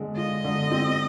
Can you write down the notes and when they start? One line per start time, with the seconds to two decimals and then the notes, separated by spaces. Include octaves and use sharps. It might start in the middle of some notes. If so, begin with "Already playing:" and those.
Already playing: D3 G#3
0.16 F4 D#5
0.44 D3
0.71 C4